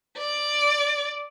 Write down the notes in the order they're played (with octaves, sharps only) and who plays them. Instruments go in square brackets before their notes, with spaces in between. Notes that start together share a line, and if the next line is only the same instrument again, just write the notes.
[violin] D5